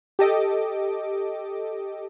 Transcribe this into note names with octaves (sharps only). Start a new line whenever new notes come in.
G4 A4 D#5 D6